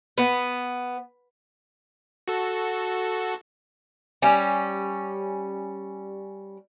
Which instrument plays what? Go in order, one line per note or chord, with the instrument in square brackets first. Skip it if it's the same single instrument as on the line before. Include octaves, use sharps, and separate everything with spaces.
[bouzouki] B3
[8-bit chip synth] F#4 A4
[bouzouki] G3 C#4